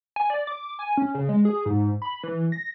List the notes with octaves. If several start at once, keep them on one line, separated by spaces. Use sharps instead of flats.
G#5
D5
D6
G#5
C#4
C#3
G#3
G#4
G#2
B5
E3
A#6